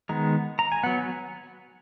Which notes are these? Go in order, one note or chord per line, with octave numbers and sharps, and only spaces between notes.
D#3 G#3 B3 A#5
A#5
G#5
F#3 B3 F#5